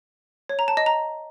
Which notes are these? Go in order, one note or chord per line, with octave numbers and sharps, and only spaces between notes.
C#5
A#5
A5
D#5
A#5